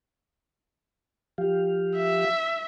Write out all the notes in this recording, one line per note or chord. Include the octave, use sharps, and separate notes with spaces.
F3 G4 F5
E5